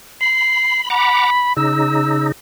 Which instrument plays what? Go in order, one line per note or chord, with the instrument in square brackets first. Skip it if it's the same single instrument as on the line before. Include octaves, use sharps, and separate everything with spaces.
[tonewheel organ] B5 [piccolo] C7
[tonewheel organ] F#5 A#5 D6 [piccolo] B5
[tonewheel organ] C#3 D#4 [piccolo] E6